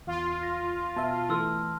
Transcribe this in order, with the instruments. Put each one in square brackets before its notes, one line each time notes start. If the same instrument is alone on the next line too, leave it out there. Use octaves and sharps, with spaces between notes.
[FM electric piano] E2 [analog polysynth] F4
[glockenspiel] A#6
[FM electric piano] B2 E5 [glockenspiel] A5
[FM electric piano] E3 A3 [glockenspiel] C6 E6 F6